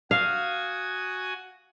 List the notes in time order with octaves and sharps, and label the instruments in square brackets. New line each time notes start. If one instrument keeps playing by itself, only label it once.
[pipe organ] F#4 G#5 D#6 [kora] F5